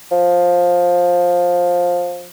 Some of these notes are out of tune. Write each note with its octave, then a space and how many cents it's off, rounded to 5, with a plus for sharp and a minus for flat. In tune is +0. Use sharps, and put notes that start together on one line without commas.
F3 +15